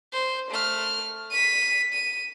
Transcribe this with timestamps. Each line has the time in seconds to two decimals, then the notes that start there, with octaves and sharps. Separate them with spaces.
0.13 C5
0.51 A3 F6
1.31 B6 D#7
1.94 D#7